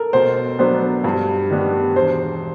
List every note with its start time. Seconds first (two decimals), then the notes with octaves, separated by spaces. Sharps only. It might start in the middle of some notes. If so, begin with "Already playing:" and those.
Already playing: A4 A#4
0.13 B2 C5
0.59 F#3 B3 D4 C5
1.04 G2
1.51 D#3 G3 B3 D4
1.95 E1 C5